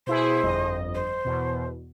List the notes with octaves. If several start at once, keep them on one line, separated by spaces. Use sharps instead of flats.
B2 E4 G#4 C5
G1 F2 D#5
C5
E2 B2